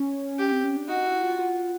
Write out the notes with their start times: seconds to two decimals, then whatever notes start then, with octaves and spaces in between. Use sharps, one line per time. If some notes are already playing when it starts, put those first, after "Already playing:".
Already playing: C#4
0.39 G4
0.52 C4
0.64 C#4
0.76 D4
0.88 D#4 F#4
1.06 E4
1.23 F4
1.39 F4